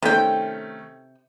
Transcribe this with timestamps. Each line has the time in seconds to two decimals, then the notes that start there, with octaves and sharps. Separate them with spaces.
0.02 C3 D#3 A3 C#4 G5